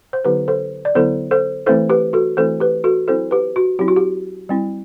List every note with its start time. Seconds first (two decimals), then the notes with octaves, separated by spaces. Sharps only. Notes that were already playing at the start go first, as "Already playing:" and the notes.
0.13 C5
0.25 D3 F#3 B3 E4 G4 B4
0.48 A4 C5
0.85 D5
0.95 D3 F#3 B3 E4 A4 C5
1.31 A4 C5
1.66 E3 A3 C4 E4 A4 C5
1.90 G4 B4
2.13 F#4 A4
2.37 E3 A3 C4 E4 A4 C5
2.60 G4 B4
2.84 F#4 A4
3.08 F#3 C4 E4 A4 C5
3.31 G4 B4
3.56 F#4
3.79 F#3 C4 E4 G4
3.88 F#4
3.96 G4
4.49 G3 C4 E4